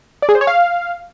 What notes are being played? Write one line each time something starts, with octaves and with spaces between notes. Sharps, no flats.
D5
G#4
C5
C#5
F5